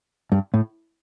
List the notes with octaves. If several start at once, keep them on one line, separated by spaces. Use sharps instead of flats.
G2
A2